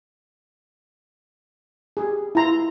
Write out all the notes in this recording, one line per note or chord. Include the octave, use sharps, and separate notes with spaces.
G4 G#4
E4 F4 A#5 C6